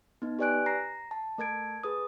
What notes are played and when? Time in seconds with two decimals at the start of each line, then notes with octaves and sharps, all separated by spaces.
0.22 B3 D#4
0.39 G4 B4 D5 G#5 F#6 D7
0.66 A#5 A#6 C7
1.11 A5
1.38 A3 A#4 A5 G#6 D7
1.83 G#4 B4 D#6